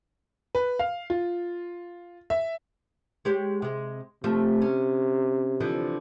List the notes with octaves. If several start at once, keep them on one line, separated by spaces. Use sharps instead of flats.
B4
F5
F4
E5
G#3 G4 C#5
C3 G#3
C3 F3 A3
C#4
D3 E3 F3